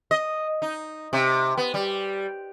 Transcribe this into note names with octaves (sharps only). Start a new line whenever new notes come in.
D#5
D#4
C3
B3
G3